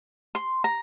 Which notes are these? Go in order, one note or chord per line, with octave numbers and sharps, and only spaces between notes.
C6
A#5